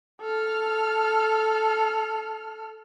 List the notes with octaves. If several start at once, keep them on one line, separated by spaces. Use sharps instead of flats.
A4 F6